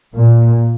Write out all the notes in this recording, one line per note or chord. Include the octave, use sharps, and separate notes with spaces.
A#2